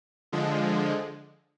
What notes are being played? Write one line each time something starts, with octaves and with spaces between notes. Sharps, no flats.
D3 F3 G#3